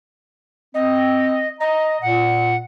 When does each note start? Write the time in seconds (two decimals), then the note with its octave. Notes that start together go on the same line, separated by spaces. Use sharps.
0.74 C4 D#5
1.60 D#5 A#5
2.01 A#2 F#5